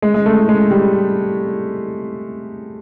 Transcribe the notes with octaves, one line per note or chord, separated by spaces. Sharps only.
G#3
G#3
A3
G#3
G3